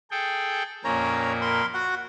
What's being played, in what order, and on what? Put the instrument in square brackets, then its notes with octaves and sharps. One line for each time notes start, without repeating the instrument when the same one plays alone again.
[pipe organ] G#4 A4 G5
[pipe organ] F2 A#2 A#3 [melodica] C#4 C#5 A#5
[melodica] A#4 B5 C6
F#4 F#5